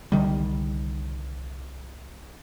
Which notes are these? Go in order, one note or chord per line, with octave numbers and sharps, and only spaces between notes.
C2 D3 D#3 G3